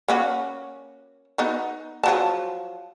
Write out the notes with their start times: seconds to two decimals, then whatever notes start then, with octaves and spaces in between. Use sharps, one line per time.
0.08 A#3 C#4 F#4
1.38 B3 D#4 F#4
2.03 F3 F#3 A5